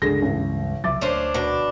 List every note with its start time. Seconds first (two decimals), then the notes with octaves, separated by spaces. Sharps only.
0.02 C#2 G2 D3 G#4 A#6
0.22 A1
0.84 C2 F#3 E5 D6 A6
1.01 D2 C#4 D4 C5
1.34 B2 D4